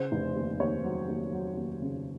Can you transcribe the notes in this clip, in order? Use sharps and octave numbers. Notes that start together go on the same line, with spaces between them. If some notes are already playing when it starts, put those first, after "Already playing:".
Already playing: C#3 C5
F1
D#2
D#2 C#5
F#3
D#2
F#3
D#2
C#3